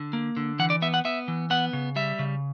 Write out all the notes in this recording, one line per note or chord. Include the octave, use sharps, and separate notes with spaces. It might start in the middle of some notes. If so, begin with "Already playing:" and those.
Already playing: D3
A#3
D3
E3 F#5
D5
B3 E5
F#5
B3 E5
E3
B3 F#5
C#3
G3 E5
C#3